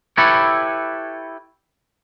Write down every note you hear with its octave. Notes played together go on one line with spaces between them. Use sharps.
E4 G4 A4 B4 C#5